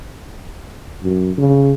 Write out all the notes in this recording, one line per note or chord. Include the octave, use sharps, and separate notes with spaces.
F#2
C#3